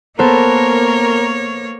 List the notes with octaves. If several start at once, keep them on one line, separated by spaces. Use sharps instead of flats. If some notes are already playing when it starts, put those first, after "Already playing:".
A#3 B3 A4 A#4 C5 C#5